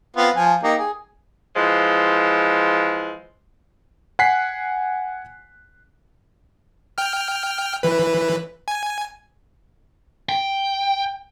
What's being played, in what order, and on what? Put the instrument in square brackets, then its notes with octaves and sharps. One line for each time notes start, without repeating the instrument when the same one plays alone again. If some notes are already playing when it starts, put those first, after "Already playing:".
[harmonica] B3 C4 F4
F3 G#5
A#3 D#4 G4
G#4
[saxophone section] E3 F3 G#3
[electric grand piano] F#5 G#5 F#6 B6 C7
[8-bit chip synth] G5 F6
E3 B4
G#5
[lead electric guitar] G5